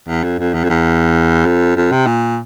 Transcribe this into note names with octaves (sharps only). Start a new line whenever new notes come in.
E2
F2
F2
E2
F2
E2
F2
F2
C3
A#2